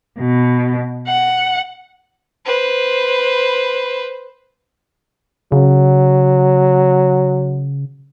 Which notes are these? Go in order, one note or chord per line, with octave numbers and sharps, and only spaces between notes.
B2
F#5
B4 C5
C#3 F#3